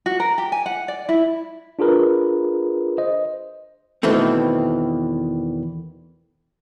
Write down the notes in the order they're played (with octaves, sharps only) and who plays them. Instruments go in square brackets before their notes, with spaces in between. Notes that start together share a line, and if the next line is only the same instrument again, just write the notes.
[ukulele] F#4
A#4
G4
G#5
F#5
D5
E4
[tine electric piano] D4 F4 G#4 A#4 B4
C5 D#5
[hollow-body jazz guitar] E2 B2 D#3 E3 A3 C4